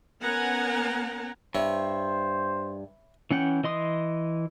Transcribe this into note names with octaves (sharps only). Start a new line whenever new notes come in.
B3 C#4 A#4 F#5 G#5 A#5
G2 E4 C5 C#5
E3 C#4 F#5 G5
E3 D#5 C6 D#6